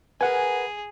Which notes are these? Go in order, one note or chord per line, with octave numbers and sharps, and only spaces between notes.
G#4 A#4 B4 F#5 G#5